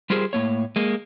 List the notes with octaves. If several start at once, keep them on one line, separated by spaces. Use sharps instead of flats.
G3 F4 G4 G#4 A#4 C5
A2 A#3 C#5
G#3 A#3